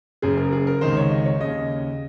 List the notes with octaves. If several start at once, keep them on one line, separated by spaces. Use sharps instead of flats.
F#1 F#2 C#3 G#4
A#4
G#4
A#4
C#2 C3 D#3 C5
C#5
D#5
C#5
D#2 C#3 D#5